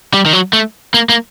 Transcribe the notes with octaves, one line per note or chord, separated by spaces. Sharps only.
G3
D#3
F#3
A3
A#3
A#3